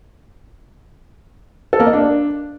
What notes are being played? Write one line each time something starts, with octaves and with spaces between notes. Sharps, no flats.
A4
A#3
D#5
D4